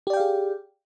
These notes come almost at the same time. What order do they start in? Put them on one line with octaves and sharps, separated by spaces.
G4 D5 G5 F5 G#4